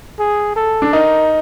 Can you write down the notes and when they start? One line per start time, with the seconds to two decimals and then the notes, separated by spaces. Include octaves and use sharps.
0.19 G#4
0.56 A4
0.82 D4
0.93 D#4 A#4